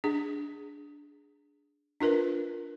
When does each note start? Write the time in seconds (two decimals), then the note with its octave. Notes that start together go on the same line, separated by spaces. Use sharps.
0.04 D4 G#4
2.00 D4 F4 A#4 B4